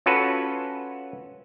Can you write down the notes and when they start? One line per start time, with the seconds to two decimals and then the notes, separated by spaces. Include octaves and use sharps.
0.06 C#4 F4 F#4 A4 B4